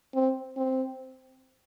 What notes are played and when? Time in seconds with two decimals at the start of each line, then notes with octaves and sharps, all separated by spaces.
0.14 C4
0.57 C4